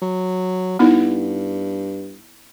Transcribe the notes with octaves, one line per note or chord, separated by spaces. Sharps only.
F#3
G2 B3 D#4 E4